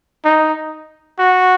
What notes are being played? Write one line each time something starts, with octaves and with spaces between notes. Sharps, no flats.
D#4
F#4